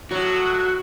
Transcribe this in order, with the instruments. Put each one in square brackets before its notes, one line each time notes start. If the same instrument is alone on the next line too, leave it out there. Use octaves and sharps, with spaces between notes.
[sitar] A2 F#3 [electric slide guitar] F#4